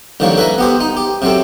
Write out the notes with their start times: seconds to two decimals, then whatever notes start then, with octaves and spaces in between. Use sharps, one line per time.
0.20 C2 D3 D#3 F3 A#3 C#5
0.37 A4 B4 E5 G#5 A#5
0.58 B3 G4 C5
0.81 D#4
0.97 G4
1.22 C3 F#3 C4 A4